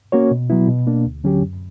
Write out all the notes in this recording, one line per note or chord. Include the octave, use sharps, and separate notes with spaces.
A#3 C#4 F#4 C#5
B2
F#3 B3 E4
B2
A#3 D4
D2
D3 F#3 C#4 G4
F#2